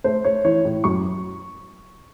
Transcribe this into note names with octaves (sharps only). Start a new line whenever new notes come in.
A3 C5
A3 C#5
E3 C#5
A2
F#2 C#6